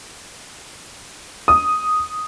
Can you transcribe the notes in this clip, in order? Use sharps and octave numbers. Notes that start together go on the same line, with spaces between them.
D#6